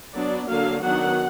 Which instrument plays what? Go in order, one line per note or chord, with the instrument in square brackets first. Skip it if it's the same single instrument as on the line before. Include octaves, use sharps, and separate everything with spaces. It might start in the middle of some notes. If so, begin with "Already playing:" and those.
[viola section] F#3 B3 D4 D5
D3 F#3 A#3 D4 F5
D#3 F#3 B3 D4 F#5